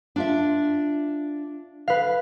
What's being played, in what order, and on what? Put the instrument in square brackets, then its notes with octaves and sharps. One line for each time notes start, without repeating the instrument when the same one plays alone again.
[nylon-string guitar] D4 F4 E5
[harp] B4 F5